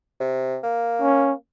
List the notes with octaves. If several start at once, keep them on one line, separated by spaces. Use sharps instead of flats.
C3
A#3
C#4